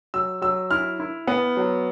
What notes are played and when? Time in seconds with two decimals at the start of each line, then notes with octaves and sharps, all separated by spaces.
0.14 F#3 E6
0.42 F#3 E6
0.71 E4 F6
1.00 E4
1.27 B3
1.57 F#3